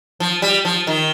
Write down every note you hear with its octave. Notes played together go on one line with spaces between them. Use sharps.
F3
G3
F3
D#3